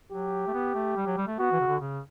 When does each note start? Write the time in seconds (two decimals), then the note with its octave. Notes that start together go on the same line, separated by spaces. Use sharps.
0.12 F#3 G4
0.47 A3
0.54 B3
0.75 A3
0.97 G3
1.06 F#3
1.18 G3
1.27 A3
1.39 B3 F#4
1.52 E3
1.61 C#3
1.67 D3
1.81 C#3